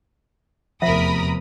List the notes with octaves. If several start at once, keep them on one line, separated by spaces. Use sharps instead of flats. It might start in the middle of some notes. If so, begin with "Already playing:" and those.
F1 E2 C3 F3 A#4 E5 B5 D#6